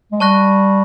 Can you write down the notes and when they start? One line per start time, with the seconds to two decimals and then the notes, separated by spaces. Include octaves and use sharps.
0.12 G#3
0.20 G3 A5 C#6 F#6 A#6